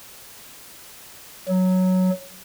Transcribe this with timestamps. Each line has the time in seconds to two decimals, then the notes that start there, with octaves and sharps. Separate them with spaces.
1.49 F#3